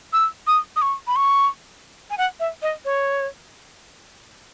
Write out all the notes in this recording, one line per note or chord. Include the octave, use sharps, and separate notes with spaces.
E6
D#6
D#6
C#6
B5
C#6
G#5
F#5
E5
D#5
C#5